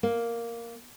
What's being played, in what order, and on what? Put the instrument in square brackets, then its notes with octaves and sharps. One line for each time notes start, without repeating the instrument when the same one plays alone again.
[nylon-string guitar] A#3